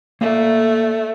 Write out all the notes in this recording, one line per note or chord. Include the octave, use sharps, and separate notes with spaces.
A3 A#3 D5